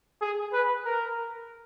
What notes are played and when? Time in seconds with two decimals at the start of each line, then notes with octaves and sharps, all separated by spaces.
0.21 G#4
0.53 B4
0.85 A#4